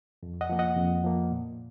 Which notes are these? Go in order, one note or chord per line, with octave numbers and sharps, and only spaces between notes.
F2
D#5 F#5
F3 A#3
D#5 F#5
F2
F3 A#3
A#2